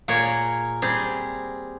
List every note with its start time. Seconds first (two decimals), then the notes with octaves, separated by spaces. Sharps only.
0.08 A#2 A#3 G#4 A#4 C#5
0.82 G3 C4 G#4